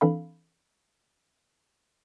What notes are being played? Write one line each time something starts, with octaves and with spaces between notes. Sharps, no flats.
E3 C4 D4 A4 F5 B5